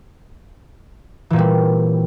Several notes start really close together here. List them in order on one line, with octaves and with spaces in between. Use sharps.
E3 A#2 C4 G3